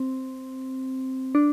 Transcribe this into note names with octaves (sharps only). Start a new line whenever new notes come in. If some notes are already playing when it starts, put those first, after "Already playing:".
Already playing: C4
D4